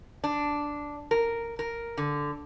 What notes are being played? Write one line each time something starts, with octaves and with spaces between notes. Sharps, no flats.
D4
A#4
A#4
D3